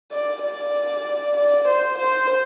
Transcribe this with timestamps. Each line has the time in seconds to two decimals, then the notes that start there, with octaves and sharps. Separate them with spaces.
0.11 D5
0.43 D5
1.36 D5
1.67 C5
1.98 C5